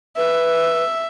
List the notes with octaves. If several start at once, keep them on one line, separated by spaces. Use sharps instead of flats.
B4 E5